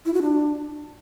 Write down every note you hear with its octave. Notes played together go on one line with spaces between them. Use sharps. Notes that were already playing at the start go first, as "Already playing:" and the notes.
E4
F#4
D4